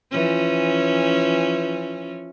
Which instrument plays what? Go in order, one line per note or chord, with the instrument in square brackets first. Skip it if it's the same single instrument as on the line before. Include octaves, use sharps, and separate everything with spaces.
[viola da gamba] E3 F3 C#4